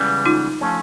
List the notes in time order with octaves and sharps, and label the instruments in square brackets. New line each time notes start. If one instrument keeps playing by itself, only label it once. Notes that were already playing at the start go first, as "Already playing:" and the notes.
Already playing: [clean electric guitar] C#2 C#3 E3 G3 B3
[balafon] D#4 F4
[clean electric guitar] F3 A3 C#4